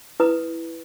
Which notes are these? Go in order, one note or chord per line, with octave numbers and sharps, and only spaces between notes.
E4 B4 A#5 D#6